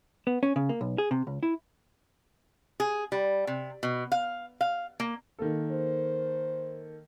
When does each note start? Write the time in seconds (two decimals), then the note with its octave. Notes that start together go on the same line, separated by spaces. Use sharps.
0.27 B3
0.43 C#4
0.56 C#3
0.69 A#3
0.81 B1
0.98 G#4
1.11 C3
1.27 C#2
1.43 E4
2.80 G#4
3.12 G3
3.47 C3
3.83 B2
4.12 F5
4.61 F5
5.00 A#3
5.39 D#3 A#3 A4
5.71 C5